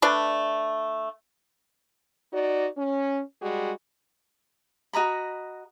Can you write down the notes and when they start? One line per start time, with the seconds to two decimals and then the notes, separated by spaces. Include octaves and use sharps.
0.02 A3 D4 B4 D5
2.32 D#4 F#4 D5
2.76 C#4
3.41 G3 G#3 F#4 G#4
4.93 F#4 D#5 A#5 B5